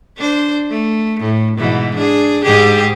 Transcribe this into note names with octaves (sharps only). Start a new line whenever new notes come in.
D4 C5
A3
A2
G#2 B2 E3
D4 G#4
G#2 G4 G#4